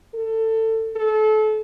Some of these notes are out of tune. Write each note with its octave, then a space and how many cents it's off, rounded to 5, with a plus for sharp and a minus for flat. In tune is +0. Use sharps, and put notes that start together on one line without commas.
A4 +20
A4 -30